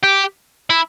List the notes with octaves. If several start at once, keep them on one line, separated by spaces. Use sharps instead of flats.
G4
E4